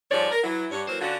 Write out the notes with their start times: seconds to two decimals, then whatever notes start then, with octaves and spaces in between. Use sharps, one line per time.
0.11 G#2 F3 G3 G#3 C#5 D5
0.31 A#4
0.44 E3 F#3 E4
0.71 G2 C#5
0.88 E3 F#3 A#3 C5
1.01 D3 C#4 D4 F4 F#4